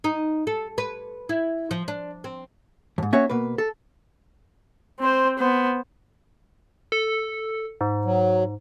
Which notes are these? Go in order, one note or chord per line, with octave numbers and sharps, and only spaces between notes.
D#4
A4
B4
E4
F3
D4
C4
F2 G#2
A#3 C#4 F#4 C#5 E5
B2 A#3 B4
A4
C4 C5
B3 C5
A4
G#2
F#3